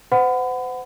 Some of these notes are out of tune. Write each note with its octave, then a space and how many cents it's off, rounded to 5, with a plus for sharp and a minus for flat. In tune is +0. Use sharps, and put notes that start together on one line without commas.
C5 -40 F#5 +0 B5 +30